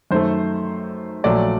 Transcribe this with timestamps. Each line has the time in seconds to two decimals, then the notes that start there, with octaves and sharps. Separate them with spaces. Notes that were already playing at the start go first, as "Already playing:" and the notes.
0.11 F#2 D#3 A3 C5
1.24 A#1 A#2 F#3 A3 D5